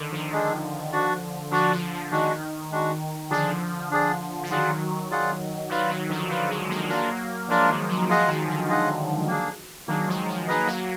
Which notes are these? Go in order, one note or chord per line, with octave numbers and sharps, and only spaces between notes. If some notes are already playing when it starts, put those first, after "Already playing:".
Already playing: D3 D#3
D3 F3
G#3 D4 G#4
D4 F#4 D5
D3 F3 D4 F#4 D5
D3 F3
D3
D#3 G#3 D4 F#4
G#3 D4 F#4
D3 F3 D4 G#4 D5
D4 G#4 D5
F3
D#3 F#3 F4 G#4 D5 F#5
F4 G#4 D5 F#5
D#3 F#3 F4 B4 D5 F5
D#3
D3 F3
D#3 F#3 F4 B4 D5 F5
F3 G#3
F#3 A#3
F#3 A#3 D4 F4 A#4 D5
F3 G#3 D4 F4 A#4 D5
D#3 F#3
D#3 F#3
F3 G#3 F4 G#4 D#5 F#5
D#3 F#3
D3
F4 G#4 D#5 F#5
A#3 D4 G#4
D#3 F#3 A#3 D4 G#4
F3 G#3
F3 G#3
F#3 A#3 D#4 G#4 B4 D#5
F#3 A#3